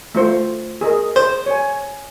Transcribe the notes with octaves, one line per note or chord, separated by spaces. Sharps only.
A3 F4 C5
G#4 A#4 D#5
C5
C#5 G#5